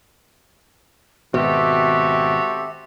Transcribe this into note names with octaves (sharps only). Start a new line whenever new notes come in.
G#1 B2 C4 F#4 G4 A4 E5